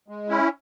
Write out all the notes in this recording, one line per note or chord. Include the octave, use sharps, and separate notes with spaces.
G#3
C#4 E4